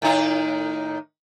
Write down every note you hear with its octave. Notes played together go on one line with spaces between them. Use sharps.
A2 D#3 D#4